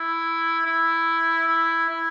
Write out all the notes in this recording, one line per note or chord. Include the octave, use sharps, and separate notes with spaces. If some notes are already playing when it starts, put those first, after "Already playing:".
Already playing: E4
E4
E4
E4